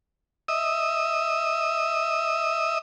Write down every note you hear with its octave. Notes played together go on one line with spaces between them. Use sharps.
D#5 E5 D#6 E6